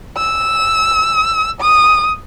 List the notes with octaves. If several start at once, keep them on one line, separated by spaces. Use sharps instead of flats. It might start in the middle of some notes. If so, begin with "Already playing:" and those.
E6
D#6